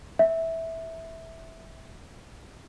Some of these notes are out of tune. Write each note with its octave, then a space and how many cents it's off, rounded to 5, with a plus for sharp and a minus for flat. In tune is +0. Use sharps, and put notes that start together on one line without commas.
E5 -10